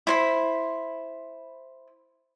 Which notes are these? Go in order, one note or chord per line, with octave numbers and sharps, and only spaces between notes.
E4 C5 B5